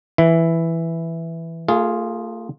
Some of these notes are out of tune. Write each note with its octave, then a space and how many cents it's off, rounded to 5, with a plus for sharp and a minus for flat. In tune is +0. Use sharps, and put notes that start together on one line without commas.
E3 +0 E4 +0
A3 +40 F4 +0 G#4 +0